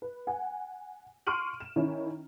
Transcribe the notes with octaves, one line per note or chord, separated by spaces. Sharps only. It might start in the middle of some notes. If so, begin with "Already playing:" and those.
B4
F#5 G#5
C6 C#6 F6 D7 D#7 F#7
E7
D#3 C#4 E4